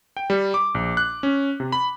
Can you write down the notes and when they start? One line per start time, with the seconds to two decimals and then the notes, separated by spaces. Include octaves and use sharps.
0.17 G5
0.30 G3
0.54 D6
0.75 A#1
0.97 F#6
1.23 C#4
1.60 C3
1.72 B5